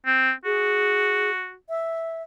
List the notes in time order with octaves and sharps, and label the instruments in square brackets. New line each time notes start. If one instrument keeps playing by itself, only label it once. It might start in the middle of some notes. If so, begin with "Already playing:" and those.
[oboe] C4
[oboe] F#4 [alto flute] G#4
[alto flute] E5